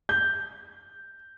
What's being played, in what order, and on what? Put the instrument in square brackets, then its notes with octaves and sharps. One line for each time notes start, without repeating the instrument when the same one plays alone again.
[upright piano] G6